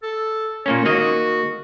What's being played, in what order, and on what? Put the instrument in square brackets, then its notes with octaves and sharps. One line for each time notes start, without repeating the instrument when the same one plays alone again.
[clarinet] A4
[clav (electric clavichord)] A#2 A#3 C#4 [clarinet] C#5
[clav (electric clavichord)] D#3 A#3 D#5 [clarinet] F#4